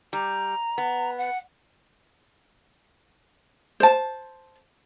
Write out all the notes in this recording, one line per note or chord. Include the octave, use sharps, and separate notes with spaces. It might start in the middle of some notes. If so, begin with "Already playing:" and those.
G3 A#5
B3
F#5
C5 A5